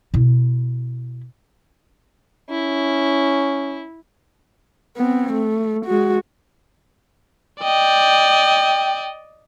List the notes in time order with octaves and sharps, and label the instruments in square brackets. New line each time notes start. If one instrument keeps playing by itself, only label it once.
[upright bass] B2 E4
[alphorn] C#4 [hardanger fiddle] E4
[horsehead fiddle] B3 C4
A3
G#3 F#4
[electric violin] D5 D#5 [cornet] G5